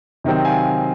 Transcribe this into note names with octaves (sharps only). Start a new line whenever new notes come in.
C3 D#3 F#3 C4
F5 G#5